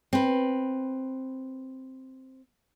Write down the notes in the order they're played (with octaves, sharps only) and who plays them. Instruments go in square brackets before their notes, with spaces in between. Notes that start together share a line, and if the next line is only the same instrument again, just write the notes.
[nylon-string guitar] C4 B4